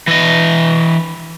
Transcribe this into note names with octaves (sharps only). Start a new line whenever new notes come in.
E3 D#5